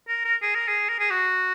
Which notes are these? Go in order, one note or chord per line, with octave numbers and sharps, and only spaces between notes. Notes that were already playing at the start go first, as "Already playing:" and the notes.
A#4
A#4
G#4
A#4
G#4
A#4
G#4
F#4